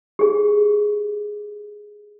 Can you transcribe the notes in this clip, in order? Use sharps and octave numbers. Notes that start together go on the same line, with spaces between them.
G4 G#4